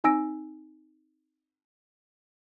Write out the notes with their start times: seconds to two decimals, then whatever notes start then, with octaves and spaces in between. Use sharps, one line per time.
0.04 C4 D#4 G#5 E6 A#6 D7